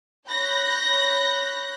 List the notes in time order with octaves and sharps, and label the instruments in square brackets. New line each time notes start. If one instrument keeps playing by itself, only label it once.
[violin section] C#5 B5 F#6 G6 A#6